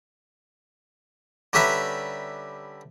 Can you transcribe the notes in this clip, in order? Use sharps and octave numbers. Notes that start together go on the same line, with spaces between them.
D3 G3 C#4 B4 E5 A#5